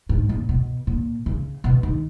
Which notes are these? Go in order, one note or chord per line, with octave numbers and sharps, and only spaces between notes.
G#2
A#2
B2
A#2
C#3
B2
D#3